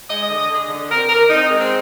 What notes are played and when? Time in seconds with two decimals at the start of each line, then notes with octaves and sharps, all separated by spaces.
0.08 G#3 D#5
0.23 D3 D#5
0.38 D#5
0.49 D3
0.54 G#4
0.69 D3
0.89 C4 A#4
1.09 D3 A#4
1.30 C4 D#4
1.50 G#3
1.60 C4